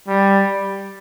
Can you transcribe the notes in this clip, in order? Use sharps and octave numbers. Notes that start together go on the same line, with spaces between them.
G3